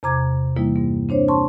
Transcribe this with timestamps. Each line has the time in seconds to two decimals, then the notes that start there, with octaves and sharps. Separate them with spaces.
0.03 E2 C3 A#5 D6 G#6
0.57 E3 G3 A#3 D#4 E4
0.76 G2 A#3
1.09 C4 D4 C5 C#5
1.28 A5 C6 C#6